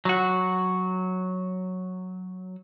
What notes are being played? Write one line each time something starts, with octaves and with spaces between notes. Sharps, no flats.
F#3 F#4